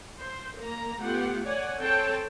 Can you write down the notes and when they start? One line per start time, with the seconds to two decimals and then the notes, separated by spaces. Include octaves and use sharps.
0.19 C5
0.57 A#3 A#5
1.00 A3 B3 F4 G4 F#5
1.45 C#5 D5 F#5 G#5
1.78 C4 G#4 A4 C#5 G5 A5